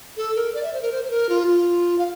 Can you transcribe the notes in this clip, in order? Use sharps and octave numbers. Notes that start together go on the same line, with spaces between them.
A4
A#4
D5
E5
C5
A#4
C5
C5
A#4
F4
F4
F5